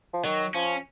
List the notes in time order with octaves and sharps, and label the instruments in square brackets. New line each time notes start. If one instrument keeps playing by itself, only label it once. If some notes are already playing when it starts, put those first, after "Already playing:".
[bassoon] F3
[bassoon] D#3 [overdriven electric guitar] F#3
[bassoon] F3 [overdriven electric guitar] C#4